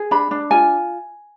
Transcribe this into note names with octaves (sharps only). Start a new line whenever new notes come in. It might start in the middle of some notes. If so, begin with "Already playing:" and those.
Already playing: G#4
D4 B5
D4
F4 G#5